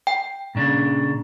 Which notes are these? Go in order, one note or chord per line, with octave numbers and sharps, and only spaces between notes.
G5
A#2 C#3 D4